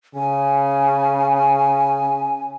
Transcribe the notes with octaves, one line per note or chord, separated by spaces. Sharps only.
C#3 G#5